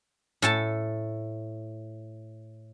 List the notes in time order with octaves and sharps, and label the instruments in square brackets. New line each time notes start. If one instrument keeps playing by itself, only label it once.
[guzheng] A2 A4 A5